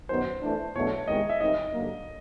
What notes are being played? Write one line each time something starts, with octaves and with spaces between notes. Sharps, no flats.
F#2 D#3 F#3 B3 C5
E3 A3 D4
E2 B2 F#3 A3 D4 C#5
E2 C3 D#3 G#3 D#5
E5
D#3 G3 C4 D#4 D#5
G2 D3 F#3 A#3